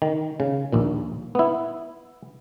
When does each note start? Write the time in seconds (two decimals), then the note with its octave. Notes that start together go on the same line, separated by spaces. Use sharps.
0.02 D#3
0.40 C#3
0.72 A#1 D#2 A#2
1.35 B3 E4